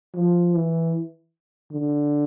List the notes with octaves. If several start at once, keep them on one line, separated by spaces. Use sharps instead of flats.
F3
E3
D3